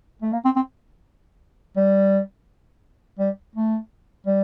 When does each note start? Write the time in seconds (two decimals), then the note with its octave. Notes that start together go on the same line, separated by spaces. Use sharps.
0.22 A3
0.33 A#3
0.45 C4
0.56 C4
1.76 G3
3.19 G3
3.56 A3
4.26 G3